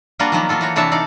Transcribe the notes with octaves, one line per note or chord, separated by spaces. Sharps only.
G3 A#3 D4 F4 F#4
D#3 F3 F#3 A#3 B3
F#3 A#3 F4 A4
E3 F#4 C#5
C3 E3 D4 C#5 E5 A5
D#4 A4 D5 F5